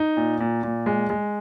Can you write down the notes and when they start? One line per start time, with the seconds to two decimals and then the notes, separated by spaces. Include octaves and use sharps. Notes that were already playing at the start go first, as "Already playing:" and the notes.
Already playing: D#4
0.17 A#2
0.40 A#2
0.63 A#2
0.86 G#3
1.10 G#3